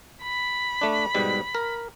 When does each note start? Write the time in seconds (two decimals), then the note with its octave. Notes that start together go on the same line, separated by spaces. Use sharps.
0.23 B5
0.81 A3 D4
1.15 G#2 B2 G3
1.55 A#4